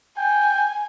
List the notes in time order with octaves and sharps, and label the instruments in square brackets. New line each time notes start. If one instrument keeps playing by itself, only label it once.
[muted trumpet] G5 [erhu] G#5